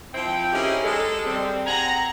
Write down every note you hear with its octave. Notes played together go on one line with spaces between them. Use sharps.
F3 C4 E4 G5
C#4 D#4 E4 G4 G#4 A#4
G#3 A4
G3 C4
C4 F#5 G#5 A#5